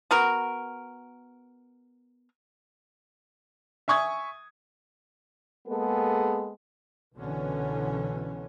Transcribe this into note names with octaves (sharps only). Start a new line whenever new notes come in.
B3 F#4 A#4
E5 G#5 C#6 D#6 G#6
G#3 A#3 B3 G#4 A4
C2 B2 D3 E3 C#4